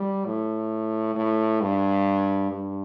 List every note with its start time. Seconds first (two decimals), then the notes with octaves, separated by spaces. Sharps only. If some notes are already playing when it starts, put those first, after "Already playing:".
Already playing: G3
0.25 A2
1.16 A2
1.61 G2
2.52 G2